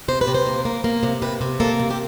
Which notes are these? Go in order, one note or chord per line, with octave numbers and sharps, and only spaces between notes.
C3 C5
B4
C3
C5
A#3
A#3
A#3
C3
C3 B4
C3
A#3 A4
C3
G4